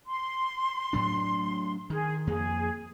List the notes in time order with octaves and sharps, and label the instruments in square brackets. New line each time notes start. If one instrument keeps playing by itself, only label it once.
[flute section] C6
[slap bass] A2 F#3 D4
[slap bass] D#3 [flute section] G#4
[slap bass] F2 A#3 [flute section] G#4